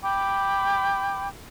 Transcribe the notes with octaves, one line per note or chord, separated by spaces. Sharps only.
G5 B5 D6